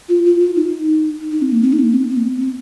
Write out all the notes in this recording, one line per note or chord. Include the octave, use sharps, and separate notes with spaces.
F4
F4
F4
D#4
D#4
C4
A#3
C4
D#4
C4
A#3
C4
C4
A#3
C4
C4